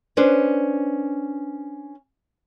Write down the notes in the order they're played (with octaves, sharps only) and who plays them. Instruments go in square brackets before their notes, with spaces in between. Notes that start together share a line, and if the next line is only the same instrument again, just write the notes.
[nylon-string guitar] C#4 D4 B4 C5